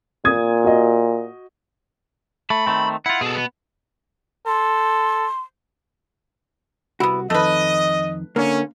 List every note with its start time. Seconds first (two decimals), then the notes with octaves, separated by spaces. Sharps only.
0.25 A#2 D#6 G#6
0.64 F#4 D#5
2.50 A3 B5
2.66 D#3 A3 C4
3.06 E4 F4 F#5
3.21 B2 G#4 A4
3.35 B3
4.47 A4 C6
7.00 C2 B3 E4 F#4
7.30 F2 D#3 A3 B4 D#5
8.36 D3 A#3 C#4